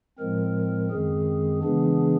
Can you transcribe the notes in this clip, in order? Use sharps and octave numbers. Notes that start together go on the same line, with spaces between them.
A2 F3 G#3 C4 A#4
F#2 D#3 G#3 C4 G#4
C#3 E3 G#3 B3 D4 G#4